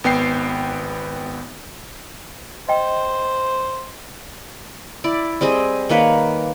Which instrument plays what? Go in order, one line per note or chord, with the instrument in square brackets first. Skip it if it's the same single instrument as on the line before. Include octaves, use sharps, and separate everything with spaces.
[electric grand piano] G#1 B3 G5 C7
[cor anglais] C5 [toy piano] D#5 G5
[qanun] E4 D5
G3 C4 G#4 D#5
D#3 A#3 B4 C#5